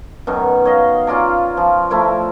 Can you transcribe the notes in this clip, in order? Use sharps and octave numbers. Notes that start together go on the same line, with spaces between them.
F#2 B2 D#3
C#5 D#5 F5
C#4 F4 D5 A#5
F3
F3 A3 E4 A#4